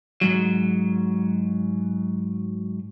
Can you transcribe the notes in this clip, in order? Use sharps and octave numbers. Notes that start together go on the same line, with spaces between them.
G#2 F#3